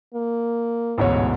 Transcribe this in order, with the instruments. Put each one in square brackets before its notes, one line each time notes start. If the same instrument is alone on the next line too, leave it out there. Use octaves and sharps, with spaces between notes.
[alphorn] A#3
[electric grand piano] A1 C#5 [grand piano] D2 G#2 B2